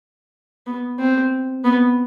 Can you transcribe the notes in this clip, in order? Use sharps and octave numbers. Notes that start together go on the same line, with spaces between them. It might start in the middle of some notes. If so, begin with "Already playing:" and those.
B3
C4
B3